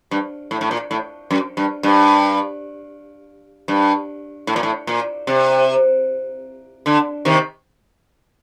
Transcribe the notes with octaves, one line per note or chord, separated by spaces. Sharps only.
G2
A2
A2
A#2
A2
F#2
G2
G2
G2
A2
A#2
A2
A#2
C3
D3
C3 D#3